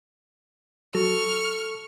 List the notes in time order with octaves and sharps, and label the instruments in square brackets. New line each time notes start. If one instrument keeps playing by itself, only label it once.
[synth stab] F#3 [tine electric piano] A4 [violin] C#6 F6